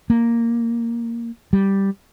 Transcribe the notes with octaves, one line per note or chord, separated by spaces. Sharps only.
A#3
G3